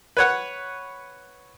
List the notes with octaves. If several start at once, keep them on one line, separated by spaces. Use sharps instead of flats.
B4 C#5 F#5